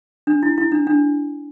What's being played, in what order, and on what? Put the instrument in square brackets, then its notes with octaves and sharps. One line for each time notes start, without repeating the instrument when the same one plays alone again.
[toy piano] D4
E4
E4
D4
D4